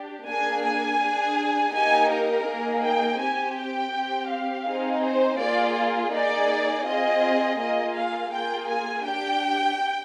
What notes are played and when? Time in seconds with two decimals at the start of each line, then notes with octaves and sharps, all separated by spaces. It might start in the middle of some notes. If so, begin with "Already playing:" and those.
Already playing: D4 G4
0.27 A#3 D4 G#4 G#5
0.63 G#5
1.00 D4 G#4
1.74 A#3 D#4 G4 G#5
2.10 A#4
2.47 A#3 D#4 G#4
2.83 G5
3.19 C4 G4 G#5
3.57 G5
3.93 C4 G4
4.30 F5
4.67 C4 D#4 G#4
5.03 C5
5.39 A#3 F4 G#4 D5
6.13 A#3 D#4 G#4 D5
6.86 C4 F4 G#4 D#5
7.59 A#3 F4 G#4 D#5
7.96 F5
8.32 A#3 F4 G#4 G5
8.69 G#5
9.05 D4 G4 G5